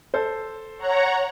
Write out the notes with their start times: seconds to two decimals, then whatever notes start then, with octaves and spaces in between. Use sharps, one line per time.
0.14 A4 C5
0.78 C#5 F#5 A#5